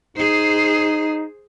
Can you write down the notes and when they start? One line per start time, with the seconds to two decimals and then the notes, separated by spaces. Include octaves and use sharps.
0.17 D#4 G#4 C5